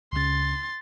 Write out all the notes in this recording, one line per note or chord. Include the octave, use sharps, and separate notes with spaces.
C#2 C#3 C6 A6